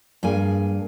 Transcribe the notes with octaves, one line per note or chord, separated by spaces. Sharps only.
G2 A#3 G#4 G#5